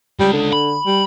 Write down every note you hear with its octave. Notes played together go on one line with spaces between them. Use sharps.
C#3 G3 G#3
D3
B5
G3